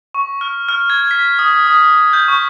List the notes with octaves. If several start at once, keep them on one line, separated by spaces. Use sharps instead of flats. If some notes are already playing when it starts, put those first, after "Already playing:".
C#6
F6
F6
G#6
B6
D#6
D#6
G6
C#6